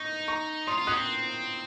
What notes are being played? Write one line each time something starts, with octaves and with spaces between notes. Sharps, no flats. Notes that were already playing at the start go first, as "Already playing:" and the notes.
Already playing: D#4 C#6
A#5 C#6
F4 C6 D#6
F4
C#4 D#6 F#6
C4